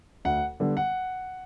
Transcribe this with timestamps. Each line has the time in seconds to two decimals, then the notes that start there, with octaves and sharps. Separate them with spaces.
0.25 D2 F#5
0.60 D3 G3 B3
0.77 F#5